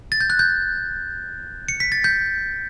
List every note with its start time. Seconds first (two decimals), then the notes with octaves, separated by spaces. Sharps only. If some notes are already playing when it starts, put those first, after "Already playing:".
0.12 A6
0.21 G6
0.30 F#6
0.39 G6
1.68 C#7
1.80 B6
1.92 A6
2.04 G6